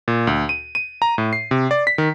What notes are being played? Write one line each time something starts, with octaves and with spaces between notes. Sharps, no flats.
A#2
D2
D#7
D#7
A#5
A2
C7
C3
D5
B6
D#3